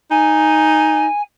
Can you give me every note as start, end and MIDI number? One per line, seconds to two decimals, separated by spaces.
0.11 1.07 63
0.11 1.21 80